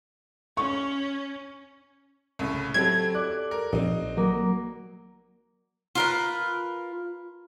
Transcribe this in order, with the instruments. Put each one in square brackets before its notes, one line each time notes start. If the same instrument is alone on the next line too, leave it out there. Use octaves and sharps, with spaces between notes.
[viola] C#4 [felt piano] C#6
[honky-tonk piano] C2 A2 C#3
[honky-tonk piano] F#3 C4 E4 [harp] G4 A4 [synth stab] G#6
[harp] D5 D6 [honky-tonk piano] F#6
[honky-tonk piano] A#4
[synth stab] A#1 [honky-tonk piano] C4 D#4
[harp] F#3 A#3
[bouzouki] F4 A#4 B4